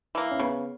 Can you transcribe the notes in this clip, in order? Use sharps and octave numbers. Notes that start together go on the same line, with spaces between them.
E3 A#3
C#4
C#3 B3